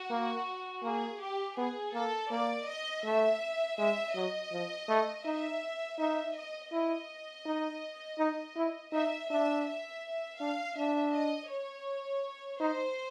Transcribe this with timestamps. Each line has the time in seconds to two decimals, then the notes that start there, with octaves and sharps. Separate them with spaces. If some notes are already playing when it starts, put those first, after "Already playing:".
Already playing: F#4
0.10 A#3
0.84 A#3 G#4
1.21 G4
1.57 B3 G#4
1.94 A#3 A4
2.31 A#3 D5
2.68 D#5
3.04 A3 E5
3.78 G#3 E5
4.15 F#3 D#5
4.52 F3
4.89 A3
5.25 D#4 E5
5.99 D#4 E5
6.35 D#5
6.72 E4 D#5
7.46 D#4
8.19 D#4
8.56 E4
8.92 D#4 E5
9.29 D4 E5
9.66 E5
10.39 D4 F5
10.77 D4 E5
11.14 D#5
11.50 C#5
12.60 D#4 C5